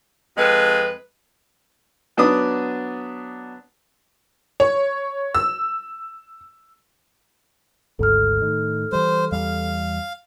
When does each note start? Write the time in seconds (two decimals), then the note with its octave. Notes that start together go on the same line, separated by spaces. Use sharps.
0.37 F2 G#3 B4
2.17 F#3 B3 D4 B4 D6 D#6
4.60 C#5
5.35 E6
7.99 G#1 D2 G#2 A4 F6
8.42 A2 D#3
8.92 E3 G3 C5
9.32 E2 E3 G3 F5